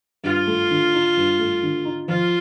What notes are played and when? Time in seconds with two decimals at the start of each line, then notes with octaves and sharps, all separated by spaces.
0.24 G2 F4
0.47 A3
0.70 D3
0.94 D#4
1.17 G2
1.39 A3
1.62 D3
1.85 D#4
2.08 F3 F4